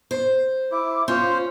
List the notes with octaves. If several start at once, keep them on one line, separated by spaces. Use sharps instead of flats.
C5
E4 D6
C#4 F4 C5